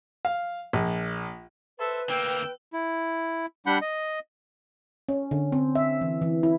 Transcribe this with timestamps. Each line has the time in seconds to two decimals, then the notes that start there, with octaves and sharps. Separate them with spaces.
0.25 F5
0.73 A#1
1.79 A4 B4 C5 E5
2.09 D2 A#3 G5 E6
2.73 E4
3.66 G3 D4 F#5 B5 G6
3.82 D#5
5.09 C#4
5.31 D3
5.52 C4
5.75 E5
6.01 E3
6.22 E3
6.43 E4